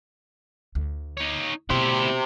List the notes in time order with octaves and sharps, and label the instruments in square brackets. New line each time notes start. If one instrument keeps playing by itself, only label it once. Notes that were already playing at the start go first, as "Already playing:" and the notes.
[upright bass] D2
[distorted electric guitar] D#4 C#5
[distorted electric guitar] D2 E4 [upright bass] B2 [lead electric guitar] G4 C5